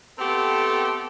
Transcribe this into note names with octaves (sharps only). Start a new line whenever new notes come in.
A3 B3 C4 G4 A4